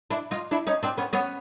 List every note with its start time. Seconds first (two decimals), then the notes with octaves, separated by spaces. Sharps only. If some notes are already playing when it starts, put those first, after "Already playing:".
0.10 D4 E4
0.31 D#4 F4
0.51 D4 E4
0.67 C#4 D#4
0.83 C4 D4
0.97 B3 C#4
1.13 B3 C#4